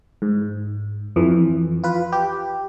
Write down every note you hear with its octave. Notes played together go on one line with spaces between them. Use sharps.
G#2
F2 E3
F4 B4
G4